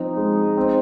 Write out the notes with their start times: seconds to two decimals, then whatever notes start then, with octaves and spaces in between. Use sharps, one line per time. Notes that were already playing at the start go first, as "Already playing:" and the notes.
Already playing: F3 C4 D#4
0.17 G#3
0.57 C4